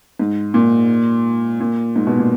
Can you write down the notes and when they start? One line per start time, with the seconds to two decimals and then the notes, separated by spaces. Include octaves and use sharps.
0.19 G#2
0.54 A#2
1.60 A#2
1.96 G#2
2.07 B2
2.19 A#2